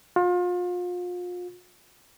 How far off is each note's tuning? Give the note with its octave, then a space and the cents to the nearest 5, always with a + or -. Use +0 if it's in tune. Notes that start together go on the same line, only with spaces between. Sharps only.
F4 +35